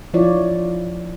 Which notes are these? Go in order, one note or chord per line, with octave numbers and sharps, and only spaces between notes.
F3 E4 F4 C#5 D5